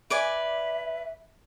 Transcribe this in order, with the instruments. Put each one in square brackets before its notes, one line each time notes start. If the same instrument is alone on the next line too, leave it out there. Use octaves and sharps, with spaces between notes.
[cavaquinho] B4 D5 G#5 [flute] E5